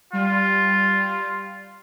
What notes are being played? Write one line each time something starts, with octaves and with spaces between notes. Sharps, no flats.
G3 F4